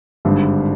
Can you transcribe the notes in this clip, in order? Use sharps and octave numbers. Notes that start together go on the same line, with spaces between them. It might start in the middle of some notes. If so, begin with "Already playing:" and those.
G#1 G2 D3